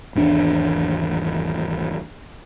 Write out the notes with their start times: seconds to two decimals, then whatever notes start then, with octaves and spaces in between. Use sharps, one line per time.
0.15 G#1 E2 D4